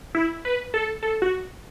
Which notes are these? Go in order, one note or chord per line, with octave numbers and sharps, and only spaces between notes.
E4
B4
A4
A4
F#4